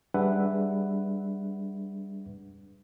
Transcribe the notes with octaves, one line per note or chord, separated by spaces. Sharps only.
G3 D4 G#4 B4 E5 F#5